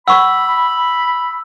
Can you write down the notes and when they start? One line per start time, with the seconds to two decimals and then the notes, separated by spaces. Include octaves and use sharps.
0.08 F#5 B5 C#6 E6